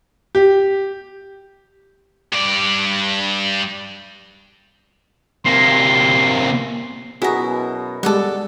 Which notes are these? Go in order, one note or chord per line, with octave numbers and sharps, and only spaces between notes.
G4
G2 D5
C3 A#3 C6
F#2 B2 E4 F#4 G#4 A#5
G3 G#3 A4 D5 F#5